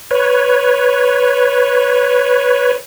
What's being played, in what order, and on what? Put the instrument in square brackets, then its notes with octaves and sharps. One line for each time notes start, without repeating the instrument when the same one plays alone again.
[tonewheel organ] B4 C#5